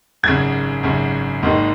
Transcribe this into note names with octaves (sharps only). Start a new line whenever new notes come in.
G#1 F#2 C#3 G#6
G#1 F#2 C#3
G#1 G#2 D#3 A#3